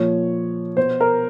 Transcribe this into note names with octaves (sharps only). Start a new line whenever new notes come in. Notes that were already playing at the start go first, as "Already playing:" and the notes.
Already playing: A#2 F3 C#5
B2 C5
A#4